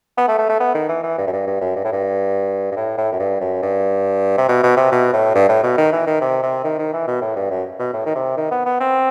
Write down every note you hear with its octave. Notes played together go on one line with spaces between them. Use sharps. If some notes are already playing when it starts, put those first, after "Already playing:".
B3
A3
A3
A3
B3
D#3
E3
E3
G2
F#2
G2
G2
F#2
G2
A2
G2
G2
A2
A2
F#2
G2
F#2
G2
C3
B2
B2
C3
B2
A2
G2
A2
B2
D#3
E3
D#3
C3
C3
D#3
D#3
E3
B2
A2
G2
F#2
B2
A2
D#3
C3
D#3
B3
B3
C4